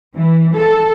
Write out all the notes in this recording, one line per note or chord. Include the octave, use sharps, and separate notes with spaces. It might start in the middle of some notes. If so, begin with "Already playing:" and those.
E3
A4